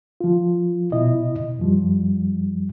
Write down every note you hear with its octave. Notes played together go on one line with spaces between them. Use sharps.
F3 F4
B2 E4 D#5
F#2 F3 G3